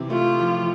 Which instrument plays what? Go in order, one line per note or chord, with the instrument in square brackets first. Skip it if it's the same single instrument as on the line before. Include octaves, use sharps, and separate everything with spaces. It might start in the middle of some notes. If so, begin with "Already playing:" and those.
Already playing: [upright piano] C3 E3
[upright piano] A3 [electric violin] F4
[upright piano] F3